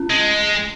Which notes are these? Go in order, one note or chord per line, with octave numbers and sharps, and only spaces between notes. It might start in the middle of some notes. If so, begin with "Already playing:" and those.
Already playing: C#4
G#3